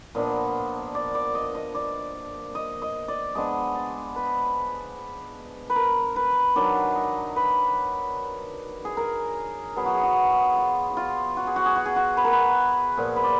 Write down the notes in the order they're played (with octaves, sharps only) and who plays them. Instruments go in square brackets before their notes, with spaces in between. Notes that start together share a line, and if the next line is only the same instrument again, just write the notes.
[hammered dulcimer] A#2 F3 B3 D4 D#5
D5
D5
D#5
D#5
D5
D#5
D#5
D5
F3 G#3 B3 D4 D#5
D5
B4
B4
A#4
B4
D#3 F#3 D4 D5
D#5
B4
G#4
A#4
B2 F#3 B3 G#4
F#4
G#4
F#4
F#4
F4
F#4
F4
F#4
G#4
F#4
G#4
F#4
G#4
F#4
B4
A#4
B4
A#2 F3 B3
B4
D5